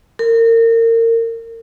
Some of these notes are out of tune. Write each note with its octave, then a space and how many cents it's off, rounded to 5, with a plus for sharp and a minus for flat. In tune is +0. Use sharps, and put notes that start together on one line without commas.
A#4 -30